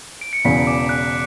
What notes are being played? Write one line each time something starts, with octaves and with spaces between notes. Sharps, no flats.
D7
C#7
E1 E2 C#3 E3 B6
D6
F#6